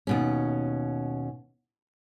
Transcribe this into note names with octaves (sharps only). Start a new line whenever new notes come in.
D#2 B2 C#4